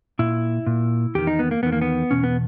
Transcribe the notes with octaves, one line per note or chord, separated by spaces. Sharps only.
A#2 E4
A#2
E2 D#3 G4
D#4
B3
A#3
E2 D#3 B3
A#3
B3
E2 B2 C#4
B3